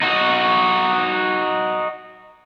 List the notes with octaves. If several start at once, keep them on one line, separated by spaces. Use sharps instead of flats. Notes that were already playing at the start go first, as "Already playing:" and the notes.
D#4 F#4